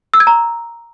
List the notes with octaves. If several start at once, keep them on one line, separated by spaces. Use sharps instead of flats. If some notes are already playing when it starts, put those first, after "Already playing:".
E6
G#6
A#5